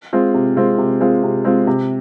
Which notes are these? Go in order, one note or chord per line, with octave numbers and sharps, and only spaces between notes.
G#3 C4 F4
C3
G#3 C4 F4
C3
G#3 C4 F4
C3
G#3 C4 F4
C3